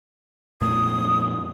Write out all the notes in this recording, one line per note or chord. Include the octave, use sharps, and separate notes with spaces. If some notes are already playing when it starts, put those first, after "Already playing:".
F2 A#2 A3 D#6